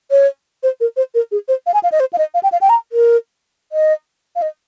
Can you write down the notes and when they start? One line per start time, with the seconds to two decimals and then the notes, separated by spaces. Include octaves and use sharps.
0.11 C#5
0.63 C5
0.80 A#4
0.97 C5
1.15 A#4
1.32 G#4
1.48 C5
1.66 F5
1.74 G#5
1.83 F5
1.92 D#5
2.00 C5
2.13 F5
2.18 D#5
2.34 F5
2.43 G5
2.52 F5
2.61 G5
2.69 A#5
2.92 A#4
3.72 D#5
4.36 F5
4.42 D#5